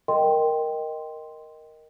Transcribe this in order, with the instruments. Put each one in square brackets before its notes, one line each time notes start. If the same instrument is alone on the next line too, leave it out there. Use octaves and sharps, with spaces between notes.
[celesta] A#4 D#5 G5 C6